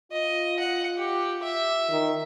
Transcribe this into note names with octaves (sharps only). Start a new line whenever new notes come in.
F4 D#5
F#5
G4
E5
D#3